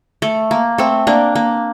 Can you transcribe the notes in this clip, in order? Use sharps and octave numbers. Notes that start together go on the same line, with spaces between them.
A3
A#3
A3 C4
A#3 D4
A#3